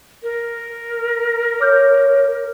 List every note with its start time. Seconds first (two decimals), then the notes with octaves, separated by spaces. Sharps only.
0.23 A#4
1.61 C#5 D6 F6 G6